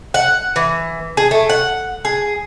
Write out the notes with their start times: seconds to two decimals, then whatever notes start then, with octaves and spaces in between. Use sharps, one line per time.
0.14 F#5
0.56 E3
1.17 G#4
1.31 A3
1.50 F#5
2.05 G#4